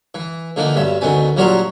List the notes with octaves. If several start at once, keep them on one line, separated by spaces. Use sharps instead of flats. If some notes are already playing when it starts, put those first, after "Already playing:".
E3
D3 E3 F3 A#3 D#4
B1 G2 E5
D2 B2 D#3 C4 G#5
A#1 F#3 G3 A#4 C#5 C6